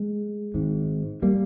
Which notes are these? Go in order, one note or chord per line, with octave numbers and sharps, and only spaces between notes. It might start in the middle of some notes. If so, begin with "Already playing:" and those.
Already playing: G#3
G#1 G#2
G3 A#3